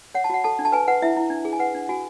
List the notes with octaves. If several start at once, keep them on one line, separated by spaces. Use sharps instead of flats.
C#5 F#5
A5
F#4 F#5
A4 A5
D4
A5
B4 G#5
B4 F#5
E4 E5
E4
D4
G#4
G#5
B4 F#5
D4
F#4 G#5